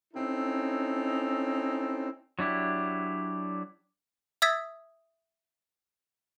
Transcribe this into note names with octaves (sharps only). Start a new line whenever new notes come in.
C4 C#4 D#4 E4 A4
F#3 D4 E4 G4
E5 D#6 E6 G#6 A6 B6